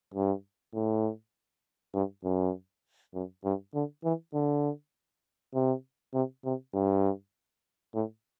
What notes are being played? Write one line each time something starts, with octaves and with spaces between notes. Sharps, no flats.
G2
A2
G2
F#2
F#2
G2
D3
E3
D3
C3
C3
C3
G2
A2